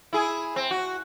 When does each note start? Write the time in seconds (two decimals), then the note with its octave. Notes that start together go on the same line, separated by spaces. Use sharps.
0.13 E4 G#4
0.56 C4
0.71 F#4